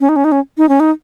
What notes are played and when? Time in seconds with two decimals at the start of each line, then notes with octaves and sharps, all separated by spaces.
0.01 C#4
0.09 D#4
0.16 C#4
0.24 D#4
0.32 C#4
0.58 D#4
0.69 C#4
0.80 D#4